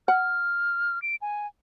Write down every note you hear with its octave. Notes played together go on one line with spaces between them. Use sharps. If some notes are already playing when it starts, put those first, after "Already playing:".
F#5 F6
D7
G#5